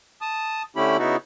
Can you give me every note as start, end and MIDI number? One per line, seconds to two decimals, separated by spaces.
0.22 0.63 81
0.22 0.63 87
0.76 0.97 50
0.76 0.97 57
0.76 0.97 61
0.76 0.97 64
0.76 0.97 67
0.76 0.97 83
0.99 1.16 49
0.99 1.16 59
0.99 1.16 63
0.99 1.16 64
0.99 1.16 66